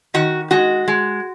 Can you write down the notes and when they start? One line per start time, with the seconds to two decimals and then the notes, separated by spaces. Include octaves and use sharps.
0.14 D#3 F#4
0.51 G#3 F#4
0.88 G#3